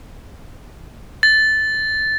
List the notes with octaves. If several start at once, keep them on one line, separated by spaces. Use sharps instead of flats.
A6